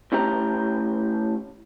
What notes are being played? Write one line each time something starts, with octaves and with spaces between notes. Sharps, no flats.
A2 C#4 G4 A#5